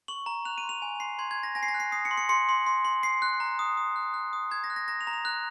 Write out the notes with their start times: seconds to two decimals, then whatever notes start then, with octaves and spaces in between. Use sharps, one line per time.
0.08 C#6 F#7
0.26 A#5
0.45 F#6 F7
0.58 D#7
0.63 C6
0.69 F7
0.82 G#5
1.00 C6 C7
1.19 C6 G#6
1.31 G#6
1.38 G#5
1.43 A#6
1.55 G#5 A#6
1.63 C7
1.68 A#6
1.74 F#6
1.80 C7
1.92 D#6 C7
2.05 C#7
2.11 C6
2.17 C#7
2.29 C6 C#7
2.49 C6
2.66 C6
2.85 C6
3.03 C6 C7
3.22 F#6
3.40 A#5
3.59 D#6
3.77 D#6
3.96 F#6
4.14 F#6
4.33 D#6
4.51 A#5 G#6
4.64 A#6
4.70 F#6
4.76 A#6
4.88 A#5 A#6
5.01 F7
5.07 A#5
5.13 F7
5.25 F#6